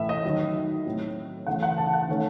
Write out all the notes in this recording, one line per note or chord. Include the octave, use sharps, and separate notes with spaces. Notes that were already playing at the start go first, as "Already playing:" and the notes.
Already playing: A2 E3 A3 E5
D#5
D#3 F#3 C#4
D#5
A2 F#3 C4
C#3 E3 A3 F#5
F#5
A5
F#5
D#3 A3 C#4